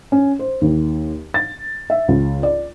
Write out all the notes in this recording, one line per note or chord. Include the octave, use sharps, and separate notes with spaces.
C#4
C5
D#2
A6
E5
C#2
D5